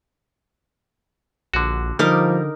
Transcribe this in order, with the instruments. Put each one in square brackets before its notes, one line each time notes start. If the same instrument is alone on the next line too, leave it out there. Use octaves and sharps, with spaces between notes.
[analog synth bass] A#1 [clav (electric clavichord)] D3 F#4
[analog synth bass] D3 [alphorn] F3 [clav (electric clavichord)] G3 [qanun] D#4 A#4 D6